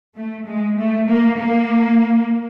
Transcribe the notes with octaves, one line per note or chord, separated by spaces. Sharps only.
A3
G#3
A3
A#3
A#3